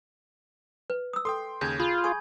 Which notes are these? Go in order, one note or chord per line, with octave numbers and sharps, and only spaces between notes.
B4
D#6 E6
A4 G5 C6 D#6
D#2 C#3 G#4 G6 G#6
F4 G#4 B5
G#4 G#5 C#6 D#6 G#6